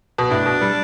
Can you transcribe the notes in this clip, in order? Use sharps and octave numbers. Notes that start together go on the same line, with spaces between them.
B2
A2 D4
B2
G3